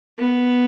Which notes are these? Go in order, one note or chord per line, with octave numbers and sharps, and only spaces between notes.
B3